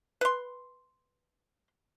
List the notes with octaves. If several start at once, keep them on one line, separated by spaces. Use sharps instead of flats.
B4 C6